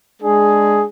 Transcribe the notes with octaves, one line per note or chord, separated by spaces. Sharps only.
G#3 D4 G#4